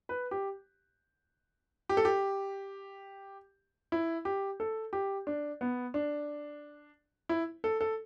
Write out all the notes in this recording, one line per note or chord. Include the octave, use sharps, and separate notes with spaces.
B4
G4
G4
A4
G4
E4
G4
A4
G4
D4
B3
D4
E4
A4
A4